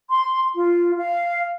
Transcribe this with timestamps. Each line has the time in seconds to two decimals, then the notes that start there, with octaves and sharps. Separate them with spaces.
0.10 C6
0.55 F4
0.98 F5